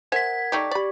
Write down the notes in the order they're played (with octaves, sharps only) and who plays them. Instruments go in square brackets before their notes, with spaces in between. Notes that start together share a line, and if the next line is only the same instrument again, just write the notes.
[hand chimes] A#4 F#5 [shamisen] C5 E5 G#5 [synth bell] G#6 B6
[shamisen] A3 D#4 G4 [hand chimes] D5 C#6 D6
[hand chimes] G4 C#6 [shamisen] D5 B5